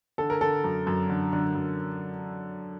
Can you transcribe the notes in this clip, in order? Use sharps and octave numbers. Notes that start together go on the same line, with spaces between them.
D3 A4
A#4
D3 A4
F#2
F#2
D3
D3
F#2